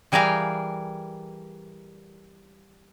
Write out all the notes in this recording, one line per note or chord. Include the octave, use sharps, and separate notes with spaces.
E3 G3 G#4 A#4 F5 G5